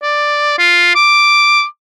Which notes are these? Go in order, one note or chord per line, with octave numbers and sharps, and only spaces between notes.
D5
F4
D6